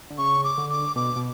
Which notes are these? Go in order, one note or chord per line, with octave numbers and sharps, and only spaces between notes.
D3
C#3 C#6
D6
D3
D6
B2 D6
B2